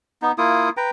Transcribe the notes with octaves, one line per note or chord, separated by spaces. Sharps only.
B3 D#4
A#3 E4 F4 D#6
B4 G5 A#5